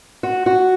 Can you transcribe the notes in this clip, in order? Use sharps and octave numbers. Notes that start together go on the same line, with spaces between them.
F#4
F#4